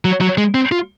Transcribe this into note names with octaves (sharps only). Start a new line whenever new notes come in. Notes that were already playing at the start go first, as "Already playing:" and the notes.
F#3
F#3
G#3
C4
F4